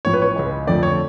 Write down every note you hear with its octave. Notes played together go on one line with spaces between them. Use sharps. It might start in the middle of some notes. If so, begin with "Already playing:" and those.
A1 A2 F3 C#5
B4
C#5
C#2 C#3 G#3
F2 D3 F3 A3 D5
C#5